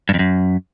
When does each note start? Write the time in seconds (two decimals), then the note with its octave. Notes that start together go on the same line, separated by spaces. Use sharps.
0.09 G2
0.14 F2
0.19 F#2